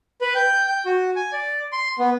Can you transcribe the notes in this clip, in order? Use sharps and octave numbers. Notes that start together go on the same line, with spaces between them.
B4
G5
G5
F#4
G#5
D5
C6
B3